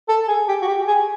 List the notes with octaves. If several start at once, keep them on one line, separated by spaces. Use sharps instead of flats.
A4
G#4
G4
F#4
G4
G#4